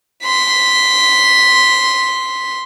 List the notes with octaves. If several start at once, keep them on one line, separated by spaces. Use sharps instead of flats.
C6 B6